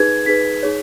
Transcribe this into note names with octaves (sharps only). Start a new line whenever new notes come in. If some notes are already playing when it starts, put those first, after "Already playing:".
Already playing: D#4 G#4 B4 G#6
D#4 G#4 B4 B6
D#4 G#4 C#5